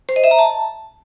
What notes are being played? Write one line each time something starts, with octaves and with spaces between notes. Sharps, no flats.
C5
D#5
E5
A#5
A5